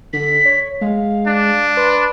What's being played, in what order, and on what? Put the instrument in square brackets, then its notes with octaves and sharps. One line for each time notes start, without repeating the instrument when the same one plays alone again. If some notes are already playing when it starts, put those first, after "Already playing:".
[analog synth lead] D3 [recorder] B6
[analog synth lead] C#5
[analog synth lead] G#3 [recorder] F5
[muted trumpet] D4
[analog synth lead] B4 [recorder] C6